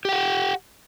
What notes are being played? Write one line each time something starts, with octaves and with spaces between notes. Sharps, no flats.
G4 F#5 G5